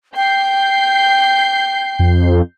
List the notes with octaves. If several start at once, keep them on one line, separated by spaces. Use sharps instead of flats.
G5 G6 C7
F2